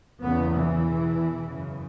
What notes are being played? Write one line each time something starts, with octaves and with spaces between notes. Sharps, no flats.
E2 C#3 B3
E3
E2 B2
F#2 C#3